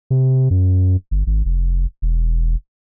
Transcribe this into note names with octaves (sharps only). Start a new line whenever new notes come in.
C3
F#2
G1
G#1
F1
E1